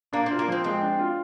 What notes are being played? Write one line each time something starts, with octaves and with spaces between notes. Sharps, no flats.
A#3 D4
C4
F4
A#3
F3 C4
G#3 C4
D4
F4